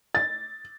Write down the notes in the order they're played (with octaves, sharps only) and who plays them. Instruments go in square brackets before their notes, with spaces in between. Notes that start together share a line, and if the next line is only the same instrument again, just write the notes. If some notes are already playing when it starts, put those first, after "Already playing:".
[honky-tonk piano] A6